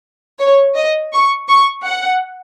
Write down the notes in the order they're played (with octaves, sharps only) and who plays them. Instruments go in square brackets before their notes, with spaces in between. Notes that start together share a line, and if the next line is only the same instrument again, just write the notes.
[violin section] C#5
D#5
C#6
C#6
F#5